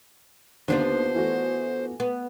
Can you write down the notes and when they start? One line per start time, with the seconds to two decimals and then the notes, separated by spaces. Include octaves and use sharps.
0.68 D#2 D3 D#3 B3 D4 F4 C5
1.15 E3 A3 F#4
2.00 B3